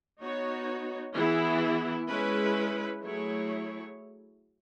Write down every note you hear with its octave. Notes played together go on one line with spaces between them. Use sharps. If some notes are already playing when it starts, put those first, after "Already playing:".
B3 D#4 F#4 C#5
E3 B3 E4 G#4
G#3 C#4 E4 B4
F#3 A3 E4 G#4 C#5